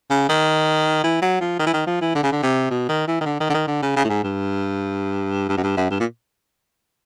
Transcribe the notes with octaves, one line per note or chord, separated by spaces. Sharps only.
C#3
D#3
E3
F#3
F3
D#3
E3
D#3
F3
E3
D3
C#3
D3
C3
B2
D#3
E3
D#3
D3
D#3
D3
D#3
D3
C#3
C#3
A2
G#2
G2
G2
F#2
G2
F#2
G2
A#2